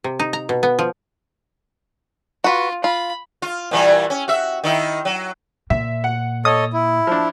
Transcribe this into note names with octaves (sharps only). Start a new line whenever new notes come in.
C3
D#4
A#5
B2
B3
F3
F4 F#4 B4
F4 B5
F4
A#2 E3 G3
C#4
F#4 E5
D#3 D#4 E4
F#3
A#2 E5
F#5
A4 C#5 D#5 D#6
E4
F3 D4